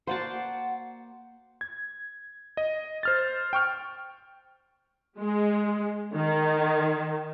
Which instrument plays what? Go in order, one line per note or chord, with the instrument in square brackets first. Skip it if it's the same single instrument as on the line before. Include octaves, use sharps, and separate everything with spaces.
[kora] A#3 F#4 [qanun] C5 D5 A5 [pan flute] F#5
[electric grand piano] G#6
D#5
C5 F6 A6
G5 C#6 F6
[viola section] G#3
D#3